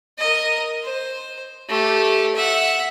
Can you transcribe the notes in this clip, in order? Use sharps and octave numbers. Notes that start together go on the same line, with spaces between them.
A#4 D#5
C5
A3 G4
E5 F#5